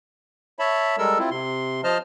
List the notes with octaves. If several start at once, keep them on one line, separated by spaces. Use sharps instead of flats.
C#5 E5 A5 B5
G3 G#3 A4 A#4 E6
C4 E4 F4
C3 C6
F3 C5 D#5 A5 F6